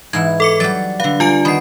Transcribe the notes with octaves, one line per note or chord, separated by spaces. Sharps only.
G#2 E3 E4 G#6
A4 D6 C#7
F#3 G3 A6
D3 B4 F5
G3 F4 G#5 D7
D#3 B3 D#4 B5 C7